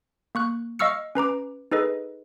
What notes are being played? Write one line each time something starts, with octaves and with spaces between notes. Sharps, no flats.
A#3 C#6 F#6
D#5 F5 C#6 E6 F6 C#7
C#4 B4 A#5 D6
D#4 G#4 A4 B4 D#5